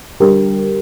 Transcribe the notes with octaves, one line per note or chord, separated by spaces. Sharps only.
D3 G3 D4 G4 A#4